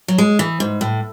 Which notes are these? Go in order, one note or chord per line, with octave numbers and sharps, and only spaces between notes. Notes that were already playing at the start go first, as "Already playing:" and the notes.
F#3
G#3
E3
G#2
A2